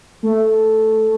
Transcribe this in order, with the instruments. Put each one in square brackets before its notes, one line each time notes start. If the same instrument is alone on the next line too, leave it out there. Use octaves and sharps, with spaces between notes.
[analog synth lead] A3